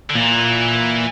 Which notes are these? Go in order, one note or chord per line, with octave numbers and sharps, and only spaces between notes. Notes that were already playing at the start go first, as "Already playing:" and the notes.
D3
A#2 E3